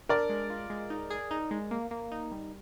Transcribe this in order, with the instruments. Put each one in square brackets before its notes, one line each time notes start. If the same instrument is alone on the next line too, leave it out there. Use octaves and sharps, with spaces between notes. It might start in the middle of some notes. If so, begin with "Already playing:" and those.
[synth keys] D4 [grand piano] A#4 D5
[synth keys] G#3
F4
G#3
D#4
G#4
D#4
G#3
A#3
A#3
D#4
G3